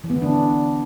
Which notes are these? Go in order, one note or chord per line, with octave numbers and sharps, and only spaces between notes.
E3
B3
D3
D4